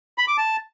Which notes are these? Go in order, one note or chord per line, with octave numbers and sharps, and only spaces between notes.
B5
D6
A5